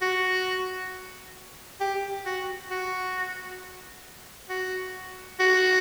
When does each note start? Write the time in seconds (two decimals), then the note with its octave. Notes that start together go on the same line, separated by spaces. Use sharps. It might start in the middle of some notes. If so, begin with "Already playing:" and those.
0.02 F#4
1.81 G4
2.26 F#4
2.71 F#4
4.50 F#4
5.40 F#4